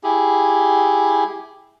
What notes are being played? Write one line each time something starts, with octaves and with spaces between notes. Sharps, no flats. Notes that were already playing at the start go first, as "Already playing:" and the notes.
E4 G4 G#4